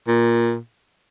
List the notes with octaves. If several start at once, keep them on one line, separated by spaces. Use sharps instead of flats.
A#2